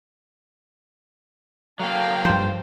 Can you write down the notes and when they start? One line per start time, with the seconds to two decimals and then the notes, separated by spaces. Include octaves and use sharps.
1.80 F#3 A#3 A4 F5 G5
2.25 G2 F3 C5